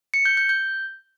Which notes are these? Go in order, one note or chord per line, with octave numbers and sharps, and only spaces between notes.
C#7
G6
G6
G6